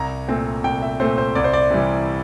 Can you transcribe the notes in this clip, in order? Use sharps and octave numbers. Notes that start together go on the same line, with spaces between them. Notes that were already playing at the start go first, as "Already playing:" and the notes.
Already playing: C2 A#5
A#2 A3 C4
C2 G5
E5
A#2 A3 C4 C5
C5
C2 D5
C5
D5
C3 E3 G3